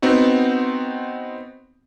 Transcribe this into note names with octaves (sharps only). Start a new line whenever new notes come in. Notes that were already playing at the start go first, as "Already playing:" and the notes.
B3 C4 D#4 F#4